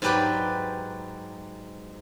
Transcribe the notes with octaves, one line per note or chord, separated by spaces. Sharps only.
G#2 F#3 G4 B4 D5 G5